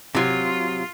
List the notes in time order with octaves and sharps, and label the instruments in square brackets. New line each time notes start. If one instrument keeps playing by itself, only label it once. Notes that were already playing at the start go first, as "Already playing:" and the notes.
[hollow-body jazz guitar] C3 F#3 [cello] F4